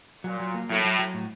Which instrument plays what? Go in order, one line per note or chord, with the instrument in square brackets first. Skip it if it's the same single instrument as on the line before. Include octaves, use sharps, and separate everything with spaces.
[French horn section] A#2 [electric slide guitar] F#3
[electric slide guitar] F#3
A#3
[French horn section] A2 [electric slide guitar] F#3
[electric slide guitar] F#3
F#3
A2